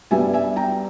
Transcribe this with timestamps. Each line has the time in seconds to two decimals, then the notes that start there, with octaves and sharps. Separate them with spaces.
0.11 G2 G3 B3 E5 G#5
0.34 E5 G#5
0.56 G5 A#5